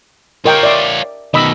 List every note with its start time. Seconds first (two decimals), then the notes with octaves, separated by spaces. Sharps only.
0.45 F4 A#4 C#5 D#5 G5
0.63 D5 E5 D6
1.34 B2 D#3 D#5 B5 E6